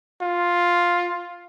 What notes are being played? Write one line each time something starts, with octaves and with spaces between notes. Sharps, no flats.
F4